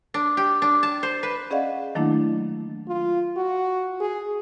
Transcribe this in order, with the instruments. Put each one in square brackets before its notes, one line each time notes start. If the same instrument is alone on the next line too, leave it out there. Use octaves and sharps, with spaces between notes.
[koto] D4
G4
D4
A5
C5
B4
[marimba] C#4 G#4 D5 D#5 F5 F#5
D#3 F#3 A3 A#3 D4 E4
[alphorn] F4
F#4
G#4